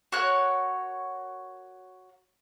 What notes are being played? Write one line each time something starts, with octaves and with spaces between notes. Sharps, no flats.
F#4 A#4 C#5 F#6